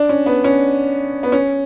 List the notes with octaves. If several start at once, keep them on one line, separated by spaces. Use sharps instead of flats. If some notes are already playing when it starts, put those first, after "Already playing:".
Already playing: D4
C#4
B3
C#4
B3
C#4